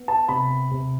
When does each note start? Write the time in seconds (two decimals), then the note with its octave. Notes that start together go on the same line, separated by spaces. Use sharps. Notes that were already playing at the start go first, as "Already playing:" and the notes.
Already playing: B3
0.08 A5
0.29 C3 B5
0.71 C3